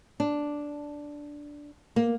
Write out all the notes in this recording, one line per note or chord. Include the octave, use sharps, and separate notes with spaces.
D4
A#3